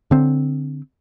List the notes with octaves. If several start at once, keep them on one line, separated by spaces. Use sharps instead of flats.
D3 C4